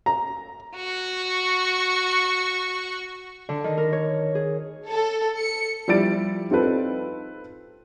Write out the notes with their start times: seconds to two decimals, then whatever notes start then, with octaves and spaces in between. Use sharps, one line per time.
0.06 A#5
0.77 F#4 C#6
3.49 D3
3.64 D#3
3.77 A#4
3.93 C#5
4.35 G#4
4.87 A4
5.37 C#7
5.88 F3 G3 E4 D5 A6 D7
6.51 C4 D#4 F4 A4 B4